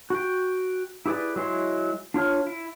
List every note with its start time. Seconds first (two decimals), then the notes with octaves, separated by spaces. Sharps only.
0.10 F#4 G5
1.06 E4 G4 G#4 B4 D5
1.36 F#3 G#3 E4 C6
2.14 D4 F4 C#5 F6
2.47 E4